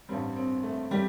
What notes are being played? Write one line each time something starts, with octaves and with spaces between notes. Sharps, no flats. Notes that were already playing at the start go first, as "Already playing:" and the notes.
A1 G2 G3 C4
C4
A3
G3 G4